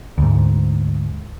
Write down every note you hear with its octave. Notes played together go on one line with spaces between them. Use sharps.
D2 G#2